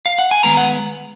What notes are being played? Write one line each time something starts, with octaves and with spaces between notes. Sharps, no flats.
F5
F#5
G#5
D#3 G#3 B3 A#5
F#5